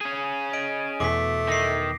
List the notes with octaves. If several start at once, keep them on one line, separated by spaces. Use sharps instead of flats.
C#4 G#4
D#5 D7
E2 B2 A3 D6 B6
D#3 A#6 C7